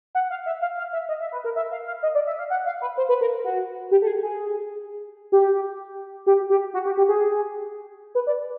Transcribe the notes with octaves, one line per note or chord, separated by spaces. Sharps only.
F#5
F5
E5
F5
F5
E5
D#5
E5
B4
A#4
E5
F5
F5
D#5
D5
E5
F5
F#5
F5
B4
C5
B4
A#4
F#4
G4
A4
G#4
G#4
G4
G4
G4
F#4
G4
G4
G#4
B4
D5